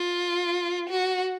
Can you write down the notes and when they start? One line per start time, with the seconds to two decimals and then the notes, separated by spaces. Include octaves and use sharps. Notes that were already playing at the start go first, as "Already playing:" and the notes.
Already playing: F4
0.89 F#4